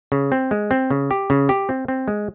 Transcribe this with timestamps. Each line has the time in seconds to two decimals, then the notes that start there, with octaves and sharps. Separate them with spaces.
0.12 C#3
0.32 C4
0.51 G#3
0.71 C4
0.91 C#3
1.11 G4
1.30 C#3
1.49 G4
1.69 C4
1.88 C4
2.08 G#3